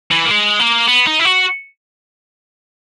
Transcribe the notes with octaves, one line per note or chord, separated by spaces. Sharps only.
E3
A#3
G#3
A#3
B3
D#4
E4
F#4